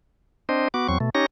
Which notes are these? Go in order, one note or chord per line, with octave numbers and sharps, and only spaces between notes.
C4 D4 C5 D#5
B3 F#4 D6
E2 F#3 C4 C#6
B2 A3
C#4 D#4 G4 C#5 A#6